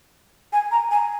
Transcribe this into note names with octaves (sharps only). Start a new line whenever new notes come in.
G#5
A#5
G#5